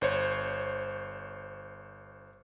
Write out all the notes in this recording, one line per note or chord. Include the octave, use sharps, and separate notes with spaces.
G1 C5 C#5